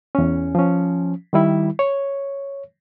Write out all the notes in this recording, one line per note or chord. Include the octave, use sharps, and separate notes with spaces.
E2 C#4
F3 C#4
D#3 G3 E4
C#5